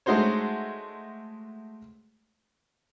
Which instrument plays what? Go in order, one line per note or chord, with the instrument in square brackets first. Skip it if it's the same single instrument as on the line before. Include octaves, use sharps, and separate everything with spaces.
[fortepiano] G#3 A3 D#4 F#4 C5 C#5